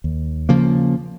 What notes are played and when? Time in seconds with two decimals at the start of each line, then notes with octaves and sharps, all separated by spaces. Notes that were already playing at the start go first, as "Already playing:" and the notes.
0.04 D#2
0.49 C#3 F3 A#3